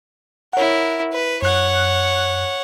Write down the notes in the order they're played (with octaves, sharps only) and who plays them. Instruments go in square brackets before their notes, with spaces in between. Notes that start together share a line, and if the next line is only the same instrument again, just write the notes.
[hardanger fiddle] E4 A#4 [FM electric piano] C#5 F#5
[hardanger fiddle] B4
[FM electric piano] F#2 F#6 [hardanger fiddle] C#5 F#5